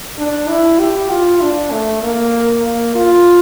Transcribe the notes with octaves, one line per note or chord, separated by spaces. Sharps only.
D4
E4
G4
F4
D4
A3
A#3
A#3
F4